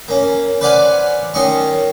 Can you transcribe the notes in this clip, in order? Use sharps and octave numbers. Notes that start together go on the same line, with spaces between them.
A#3 C#4
B4 C5 D5 F5 F#5 G#5
D#3 C#4 D#5 C6 C#6